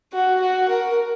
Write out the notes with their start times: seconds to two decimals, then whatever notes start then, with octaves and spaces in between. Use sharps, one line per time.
0.13 F#4
0.41 F#4
0.69 A#4